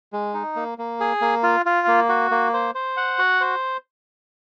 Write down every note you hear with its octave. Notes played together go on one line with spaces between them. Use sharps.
G#3
D#4
A#3
A#3
G#4
A#3
F4
F4
A#3
F#4
A#3
C5
C5
F#5
F#4
C5